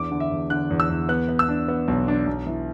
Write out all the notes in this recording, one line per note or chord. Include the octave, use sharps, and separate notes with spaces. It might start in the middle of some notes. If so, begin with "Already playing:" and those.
Already playing: E2 D4 D6
D3
E5
E2
D3 F#6
E2
E6
E2
B3 F#6
B3
E6
D4
B3
B1
D4
B1
E3